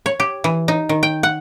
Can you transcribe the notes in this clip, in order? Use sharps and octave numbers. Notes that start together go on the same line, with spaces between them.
C#5
G4
E3
D#4
D#3
G5
F#5